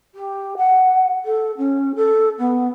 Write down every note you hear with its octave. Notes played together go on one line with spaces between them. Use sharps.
G4
F#5
A4
C#4
A4
B3